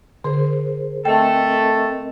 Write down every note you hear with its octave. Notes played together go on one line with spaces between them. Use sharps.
D3 G#4 A#4 C5
A3 C4 A4 A#4 D#5 G5